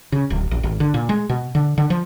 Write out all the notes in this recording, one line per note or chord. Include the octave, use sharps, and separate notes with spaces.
C#3
D1
A1
G#1
D3
A#2
G#3
B2
D3
D3
F3